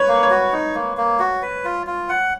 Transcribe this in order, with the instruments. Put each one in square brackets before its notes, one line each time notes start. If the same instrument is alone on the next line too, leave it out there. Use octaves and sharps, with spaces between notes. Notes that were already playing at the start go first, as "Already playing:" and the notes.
Already playing: [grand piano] B4 C#5
[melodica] A#3
[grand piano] C#5
[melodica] F#4
D#4
A#3
A#3
F#4
B4
F4
F4
F#5